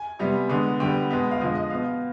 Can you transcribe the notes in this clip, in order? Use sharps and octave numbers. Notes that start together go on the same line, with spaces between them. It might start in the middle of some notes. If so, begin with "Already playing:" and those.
Already playing: G#5
C3 G3 B3
D3 G#3 B3
D3 G3 B3 G5
B2 G#3 B3
F5
D3 F3 G#3 D#5
D#5
B2 B3 F5